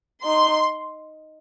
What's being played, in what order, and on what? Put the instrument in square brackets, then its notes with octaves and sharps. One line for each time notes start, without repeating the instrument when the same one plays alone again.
[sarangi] D#4 [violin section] C6